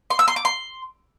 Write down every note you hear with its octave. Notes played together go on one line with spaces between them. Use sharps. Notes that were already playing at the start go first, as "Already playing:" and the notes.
C6
E6
C6
D6
C6